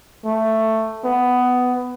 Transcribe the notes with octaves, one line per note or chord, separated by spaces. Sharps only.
A3
B3